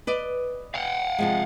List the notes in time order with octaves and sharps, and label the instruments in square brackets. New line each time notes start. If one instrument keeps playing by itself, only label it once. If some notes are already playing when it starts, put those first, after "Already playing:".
[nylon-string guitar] B4 D5 D#5
[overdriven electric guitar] F5 F#5
[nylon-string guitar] C3 F3 G#3